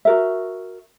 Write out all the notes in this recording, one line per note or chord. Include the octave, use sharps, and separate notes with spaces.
F#4 A#4 E5